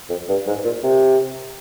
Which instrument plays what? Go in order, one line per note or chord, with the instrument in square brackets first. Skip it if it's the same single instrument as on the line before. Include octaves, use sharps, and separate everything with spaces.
[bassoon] F2
G2
G#2
A#2
C3